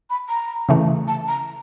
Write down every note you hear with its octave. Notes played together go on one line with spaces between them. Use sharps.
B5
A#5
C#3 E3 A3
A5
A#5